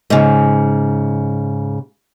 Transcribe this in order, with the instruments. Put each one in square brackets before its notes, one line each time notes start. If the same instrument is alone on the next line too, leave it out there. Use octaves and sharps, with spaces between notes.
[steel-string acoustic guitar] G#2 C#3